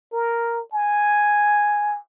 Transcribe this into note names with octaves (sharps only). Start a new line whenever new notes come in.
A#4
G#5